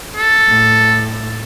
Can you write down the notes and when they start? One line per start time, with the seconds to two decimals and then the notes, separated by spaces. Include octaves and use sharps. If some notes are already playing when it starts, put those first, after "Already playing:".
0.17 A4
0.47 A2